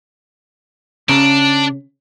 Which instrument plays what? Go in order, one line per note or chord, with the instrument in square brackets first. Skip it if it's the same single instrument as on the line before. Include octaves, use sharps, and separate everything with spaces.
[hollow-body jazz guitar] C#3 C#4 A#5 [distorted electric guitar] D4